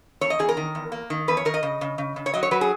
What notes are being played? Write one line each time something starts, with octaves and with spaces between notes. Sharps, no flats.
E2 C#5
D#5
E2 G#4
A#4
D#3
E2
A#3
D#3
E2 B4
C#5
D#3 A#4
D#5
C#3
C#3
C#3
C#3
C#5
F#3 D#5
C#5
F#3 B4
G#4